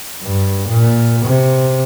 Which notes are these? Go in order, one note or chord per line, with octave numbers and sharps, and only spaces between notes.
G2
A#2
C3